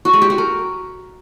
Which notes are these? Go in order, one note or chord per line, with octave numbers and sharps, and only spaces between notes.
F#4
G#3
G4
F#4
A#4